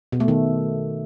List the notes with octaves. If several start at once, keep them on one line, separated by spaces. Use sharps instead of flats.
B2
A3
D#3